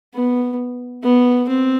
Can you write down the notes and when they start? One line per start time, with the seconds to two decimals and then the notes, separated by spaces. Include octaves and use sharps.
0.14 B3
1.03 B3
1.48 C4